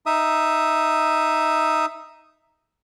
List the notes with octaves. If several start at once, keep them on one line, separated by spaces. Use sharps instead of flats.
D#4 E5 D#6